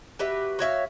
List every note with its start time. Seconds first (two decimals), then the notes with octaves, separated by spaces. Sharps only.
0.19 F#4 G4 B4 E5
0.59 F#4 C#5 E5 F5